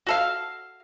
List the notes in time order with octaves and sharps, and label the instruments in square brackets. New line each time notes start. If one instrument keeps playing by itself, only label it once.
[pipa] F#4 A4 F5